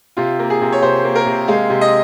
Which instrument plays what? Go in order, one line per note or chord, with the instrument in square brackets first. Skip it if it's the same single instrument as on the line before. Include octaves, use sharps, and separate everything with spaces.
[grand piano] C3 F4
A#3
G#4
C3
C#5
C3 C5
A#3
A#4
C3
G#3 F5
C3
D#5